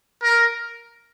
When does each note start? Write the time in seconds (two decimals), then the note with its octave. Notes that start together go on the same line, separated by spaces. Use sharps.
0.23 A#4